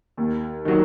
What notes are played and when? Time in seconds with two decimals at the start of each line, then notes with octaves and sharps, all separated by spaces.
0.17 D#2
0.65 D#3 F#3